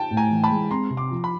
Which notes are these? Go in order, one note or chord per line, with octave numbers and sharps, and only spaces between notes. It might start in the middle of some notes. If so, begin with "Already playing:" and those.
Already playing: G5 A5
A2
G#5 A#5
E3
A5 B5
G#3
C4 A#5 C6
C3
C6 D6
F3
B5